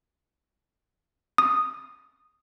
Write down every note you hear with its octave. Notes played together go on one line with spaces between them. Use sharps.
D#6